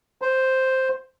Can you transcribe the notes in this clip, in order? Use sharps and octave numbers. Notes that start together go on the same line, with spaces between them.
C5